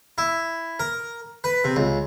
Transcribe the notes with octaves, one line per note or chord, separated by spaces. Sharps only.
E4
A#4
B4
C3
C#2